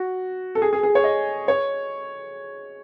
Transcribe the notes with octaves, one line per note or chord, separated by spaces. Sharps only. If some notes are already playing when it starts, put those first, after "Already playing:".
Already playing: F#4
A4
G#4
G#4
G#4
C#5
D#5
C#5